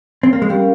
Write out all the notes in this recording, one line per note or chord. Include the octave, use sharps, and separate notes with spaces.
C4
A#3
G#3
G3 C#4 G4 A#4 F5